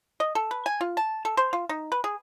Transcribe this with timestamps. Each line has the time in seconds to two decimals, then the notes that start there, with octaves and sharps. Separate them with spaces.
0.20 D#5
0.35 A4
0.51 B4
0.66 G#5
0.81 F4
0.97 A5
1.25 A4
1.37 C5
1.53 F4
1.69 D#4
1.92 B4
2.04 G#4